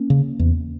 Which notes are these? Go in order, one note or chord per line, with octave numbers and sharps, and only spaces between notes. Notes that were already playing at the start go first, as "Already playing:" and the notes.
Already playing: A#3 C#4
C#3
E2